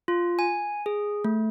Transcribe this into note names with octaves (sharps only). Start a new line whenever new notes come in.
F4
G#5
G#4
A3